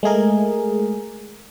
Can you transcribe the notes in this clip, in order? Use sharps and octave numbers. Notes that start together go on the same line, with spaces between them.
G#3 A3 G#4 A#4